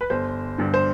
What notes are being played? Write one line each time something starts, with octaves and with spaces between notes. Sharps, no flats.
B4
G1 C5
G2 D3
C5